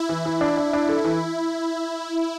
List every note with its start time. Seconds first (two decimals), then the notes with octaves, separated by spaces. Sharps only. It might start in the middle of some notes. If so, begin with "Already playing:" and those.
Already playing: E4
0.09 E3
0.25 E3
0.41 D4
0.57 D4
0.73 D4
0.89 A4
1.04 E3